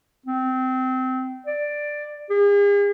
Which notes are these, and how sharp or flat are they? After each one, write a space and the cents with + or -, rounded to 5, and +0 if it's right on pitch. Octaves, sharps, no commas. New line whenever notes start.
C4 -20
D5 +10
G#4 -45